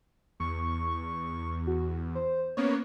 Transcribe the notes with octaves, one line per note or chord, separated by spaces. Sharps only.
E2 C#6
F#4
C5
A#3 B3 C#4 C#5